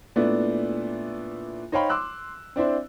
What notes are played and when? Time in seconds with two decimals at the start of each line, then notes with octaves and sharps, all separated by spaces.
0.16 A#2 A3 B3 D4 E4
1.72 D#4 C5 C#5 F5 G5 B5
1.90 C6 D6 E6 F#6
2.56 C4 D4 E4 C5